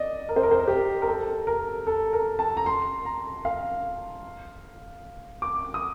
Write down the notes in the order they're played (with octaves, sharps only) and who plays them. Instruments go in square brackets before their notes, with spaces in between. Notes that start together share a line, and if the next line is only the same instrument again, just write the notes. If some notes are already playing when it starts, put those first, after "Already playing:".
Already playing: [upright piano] D5 D#5
A#4
C5
A#4
C5
A#4
G4
A#4
A4
A#4
A4
A#4
A5
A#5
C6
A#5
F5
D6
D#6